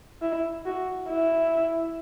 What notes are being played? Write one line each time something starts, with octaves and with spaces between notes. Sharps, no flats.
E4
F#4
E4